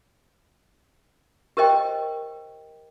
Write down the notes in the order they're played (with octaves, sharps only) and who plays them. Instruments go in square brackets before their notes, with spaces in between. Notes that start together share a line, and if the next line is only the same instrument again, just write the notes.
[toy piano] G4 A#4 C5 D#5 G5